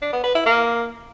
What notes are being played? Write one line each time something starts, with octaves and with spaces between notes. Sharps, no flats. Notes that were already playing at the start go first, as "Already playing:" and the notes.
D4
B3
B4
E4
A#3